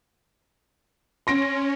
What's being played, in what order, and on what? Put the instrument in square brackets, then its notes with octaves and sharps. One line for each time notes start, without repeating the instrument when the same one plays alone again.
[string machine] C#4 [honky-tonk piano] C6 A#6 D7